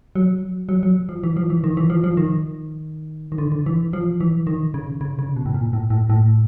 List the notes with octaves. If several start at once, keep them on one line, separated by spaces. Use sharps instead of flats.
F#3
F#3
F#3
F3
E3
F3
E3
D#3
E3
F3
F3
D#3
D#3
D3
D3
E3
F3
E3
D#3
C#3
C#3
C#3
B2
A2
A#2
A2
A2
A2